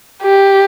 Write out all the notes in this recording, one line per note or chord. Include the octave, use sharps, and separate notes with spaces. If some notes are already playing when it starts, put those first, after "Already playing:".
G4